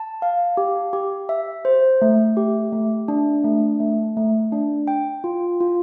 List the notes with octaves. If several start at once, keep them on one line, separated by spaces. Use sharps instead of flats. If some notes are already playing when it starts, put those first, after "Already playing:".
Already playing: A5
F5
G4
G4
E5
C5
A3
G4
A3
D4
A3
A3
A3
D4
G5
F4
F4